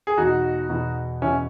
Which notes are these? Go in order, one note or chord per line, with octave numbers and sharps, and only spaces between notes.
G#4
E2 B2 D#4 F#4
E2 B2
E2 B2 C#4 E4